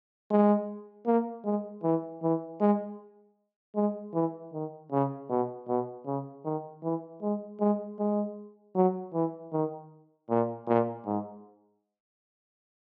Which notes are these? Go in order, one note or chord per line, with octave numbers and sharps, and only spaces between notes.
G#3
A#3
G#3
E3
E3
G#3
G#3
E3
D#3
C#3
B2
B2
C#3
D#3
E3
G#3
G#3
G#3
F#3
E3
D#3
A#2
A#2
G#2